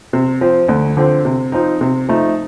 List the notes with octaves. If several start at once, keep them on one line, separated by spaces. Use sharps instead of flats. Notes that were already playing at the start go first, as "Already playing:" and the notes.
C3
F3 C4
D2
D3 F3 C4
C3
F3 C4 D#4
C3
F3 A3 D#4